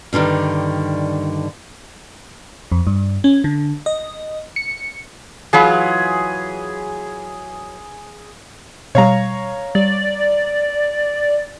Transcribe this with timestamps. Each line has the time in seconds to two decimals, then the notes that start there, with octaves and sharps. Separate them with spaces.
0.13 G2 D3 D#3 G3
2.72 F2
2.87 G2
3.24 C#4
3.44 D3
3.86 D#5
4.56 C#7
5.53 E3 F#3 F4 G#4 B5
8.95 B2 G3 C#5 F5 A#5
9.75 G3 D5